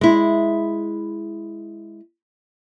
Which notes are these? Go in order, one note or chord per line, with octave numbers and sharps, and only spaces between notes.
G#3 E4